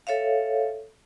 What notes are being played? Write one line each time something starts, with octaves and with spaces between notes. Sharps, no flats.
A4 C#5 E5 F5